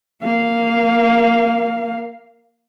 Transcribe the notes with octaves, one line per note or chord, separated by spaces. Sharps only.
A#3 F5